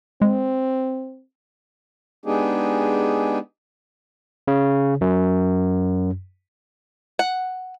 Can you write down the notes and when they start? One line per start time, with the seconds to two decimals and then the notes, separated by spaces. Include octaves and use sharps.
0.22 G#3 C4
2.25 G#3 B3 D4 D#4 G4 G#4
4.48 C#3
5.01 F#2
7.19 F#5